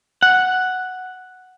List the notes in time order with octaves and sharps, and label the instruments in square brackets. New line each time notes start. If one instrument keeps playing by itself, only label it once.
[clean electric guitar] F#5